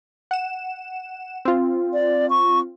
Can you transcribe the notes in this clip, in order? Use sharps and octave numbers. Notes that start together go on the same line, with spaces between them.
F#5 E7
C4 F4
D5
C#6